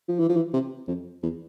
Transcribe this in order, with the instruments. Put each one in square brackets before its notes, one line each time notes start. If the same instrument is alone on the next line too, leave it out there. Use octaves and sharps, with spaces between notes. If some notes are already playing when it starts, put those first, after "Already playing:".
[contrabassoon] F3
E3
F3
E3
C3
F2
E2